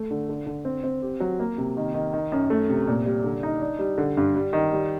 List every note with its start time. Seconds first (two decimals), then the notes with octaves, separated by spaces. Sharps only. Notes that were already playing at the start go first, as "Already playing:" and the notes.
Already playing: A3
0.11 D3
0.29 D3
0.46 D3
0.65 C4
0.84 C4
1.03 G4
1.20 F#3
1.39 A#3
1.58 C3
1.77 D#3
1.94 D#3
2.13 D#3
2.32 F#2
2.50 A3
2.69 C3
2.87 A#2
3.06 G3
3.24 D3
3.43 D#4
3.61 D4
3.79 G3
3.98 D3
4.17 G2
4.35 G3
4.53 D#3
4.72 G3